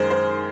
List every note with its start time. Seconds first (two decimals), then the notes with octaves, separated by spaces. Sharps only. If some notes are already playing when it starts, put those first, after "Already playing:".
Already playing: F#2 D#3 G#3 G#4 A#4 C5
0.10 C5